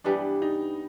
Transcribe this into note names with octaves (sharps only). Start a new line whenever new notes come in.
G2 E3 G3 B3 D4
D#4